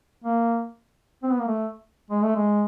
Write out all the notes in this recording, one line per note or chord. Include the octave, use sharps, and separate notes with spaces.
A#3
C4
B3
A#3
A3
G#3
A3
G#3